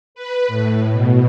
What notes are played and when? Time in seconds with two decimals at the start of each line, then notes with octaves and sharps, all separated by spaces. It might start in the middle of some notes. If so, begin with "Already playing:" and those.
0.15 B4
0.48 A2
0.91 B2